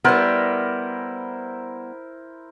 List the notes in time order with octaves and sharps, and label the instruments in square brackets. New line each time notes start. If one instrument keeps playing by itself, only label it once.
[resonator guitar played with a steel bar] G3 B3 [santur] E4 A#4 C5